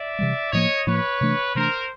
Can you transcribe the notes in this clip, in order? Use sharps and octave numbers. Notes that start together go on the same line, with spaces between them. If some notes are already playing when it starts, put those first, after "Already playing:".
Already playing: D5 E5
C3 E3 G3
A2 F3 A#3 C#5 D#5
A2 F3 A#3 B4 C#5
C3 E3 A3 D4
C3 E3 A3 D4 A#4 C5